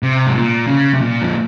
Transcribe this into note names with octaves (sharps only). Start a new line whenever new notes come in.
C3
G#2
A#2
C#3
C3
A#2
F2